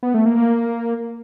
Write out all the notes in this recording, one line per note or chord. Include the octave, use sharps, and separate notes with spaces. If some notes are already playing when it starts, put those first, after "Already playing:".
B3
A3
A#3
A#3